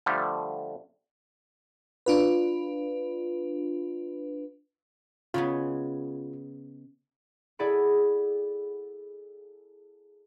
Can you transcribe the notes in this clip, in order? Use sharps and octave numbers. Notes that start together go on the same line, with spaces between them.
D3 F3 G3 A3
D4 F4 B4
C#3 G#3 B3 F4
E4 G#4 A4 D5 F#5 B5